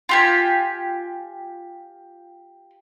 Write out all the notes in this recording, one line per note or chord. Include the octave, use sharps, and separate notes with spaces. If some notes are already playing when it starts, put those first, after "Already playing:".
F4 G4 G#5